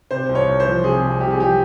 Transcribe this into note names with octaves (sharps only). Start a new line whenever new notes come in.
C3 C5
C2
C#5
C2
C5
F3
C3 G#4
C2
C2 G4
G#4
F3 G4